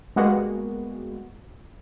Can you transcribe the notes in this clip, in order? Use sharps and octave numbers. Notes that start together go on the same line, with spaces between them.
G3 G#3 A#3 B3 F#4